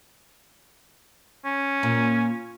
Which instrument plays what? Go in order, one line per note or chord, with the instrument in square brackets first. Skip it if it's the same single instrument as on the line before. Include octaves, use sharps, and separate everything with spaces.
[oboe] C#4
[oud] A#2